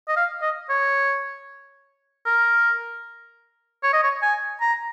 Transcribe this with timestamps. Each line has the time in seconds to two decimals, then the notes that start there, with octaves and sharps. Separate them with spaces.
0.08 D#5
0.17 F5
0.42 D#5
0.69 C#5
2.26 A#4
3.83 C#5
3.93 D#5
4.03 C#5
4.22 G#5
4.61 A#5